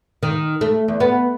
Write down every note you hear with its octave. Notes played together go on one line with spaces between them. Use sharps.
D#3
A3
E2
B3